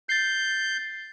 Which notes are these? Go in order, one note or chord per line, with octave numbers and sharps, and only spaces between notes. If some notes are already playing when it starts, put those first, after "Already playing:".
G6 A6 C7